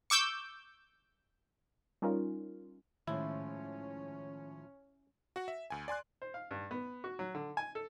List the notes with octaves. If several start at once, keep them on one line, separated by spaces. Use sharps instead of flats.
C#6 D6 E6 G6
G3 C#4 D#4 F4 A#4
A2 D#3 F3 G#3 C#4 E4
F#4 F#5
E5
D2 G#5
D5 G#5 C6 F#6
C5
F5
G2
B3
F#4
F#3
D3
G#5
A4